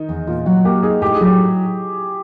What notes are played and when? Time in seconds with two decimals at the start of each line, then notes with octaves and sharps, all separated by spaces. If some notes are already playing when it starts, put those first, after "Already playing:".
Already playing: D#3 D#4
0.09 E2
0.27 A#2 F4
0.46 F#3 F#4
0.65 A#3 G4
0.83 D#4 G#4
1.02 A2 G4
1.14 G#4
1.21 F#3 G4